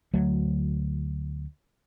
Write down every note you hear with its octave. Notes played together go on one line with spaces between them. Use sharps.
D2 F#3 A3